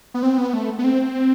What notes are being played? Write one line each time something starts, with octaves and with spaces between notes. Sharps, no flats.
B3
C4
B3
A3
B3
C4